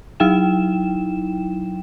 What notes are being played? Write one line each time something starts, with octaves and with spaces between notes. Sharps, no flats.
F#3 D#4 E4 G5 E7